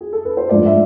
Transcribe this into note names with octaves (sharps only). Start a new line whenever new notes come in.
G#4
A4
B4
C5
G#2 F3 A3 D4 D5
E5